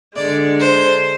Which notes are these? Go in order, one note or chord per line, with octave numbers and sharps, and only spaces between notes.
D3 G#3 D5
C5